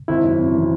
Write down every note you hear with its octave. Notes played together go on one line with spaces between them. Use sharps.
G#1 E4
F#2
C4
E3